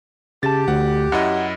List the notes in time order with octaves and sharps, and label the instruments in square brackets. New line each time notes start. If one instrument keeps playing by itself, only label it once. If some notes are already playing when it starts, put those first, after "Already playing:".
[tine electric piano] C#3 A5 [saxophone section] G4 [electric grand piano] A6
[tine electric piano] D2 [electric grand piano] F#5
[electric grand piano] F#2 E4 D#5 [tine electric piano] F#5